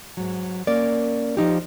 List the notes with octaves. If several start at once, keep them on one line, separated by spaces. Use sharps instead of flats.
G#2 F#3
A#3 C#4 A#4 D5
F3 D#4 G4